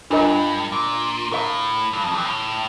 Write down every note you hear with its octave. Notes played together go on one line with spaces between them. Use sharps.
G2 D4 F4 A#4 D#5 A#5
A#2
A2 A#4 F5 A#5
G2
F2
G2
A2